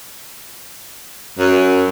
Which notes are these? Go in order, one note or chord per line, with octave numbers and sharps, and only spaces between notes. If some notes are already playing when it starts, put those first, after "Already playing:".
F#2